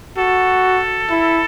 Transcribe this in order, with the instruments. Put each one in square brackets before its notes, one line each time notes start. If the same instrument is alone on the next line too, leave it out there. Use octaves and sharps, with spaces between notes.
[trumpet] F#4 [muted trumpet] A4
[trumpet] E4